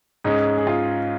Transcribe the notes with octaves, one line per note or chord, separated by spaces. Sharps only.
G#2 G#3 C#4 D#4
G#4
F4